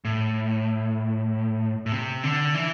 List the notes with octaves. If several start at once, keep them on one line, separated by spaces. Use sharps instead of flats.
A2
A2
C3
D3
E3